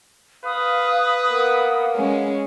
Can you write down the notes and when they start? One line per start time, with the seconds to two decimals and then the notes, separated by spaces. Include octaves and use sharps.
0.45 B4 F5 D#6
1.29 A#3 B3
1.94 G#3 C#4